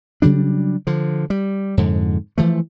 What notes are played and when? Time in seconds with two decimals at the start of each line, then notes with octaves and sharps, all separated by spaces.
0.22 C#3 F#3 G3 D4
0.87 D3 F3
1.30 G3
1.77 F2 G#2 D3
2.38 E3 F3 A3